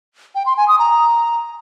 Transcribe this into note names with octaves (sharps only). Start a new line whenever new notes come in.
G5
C6
G#5
D#6
A#5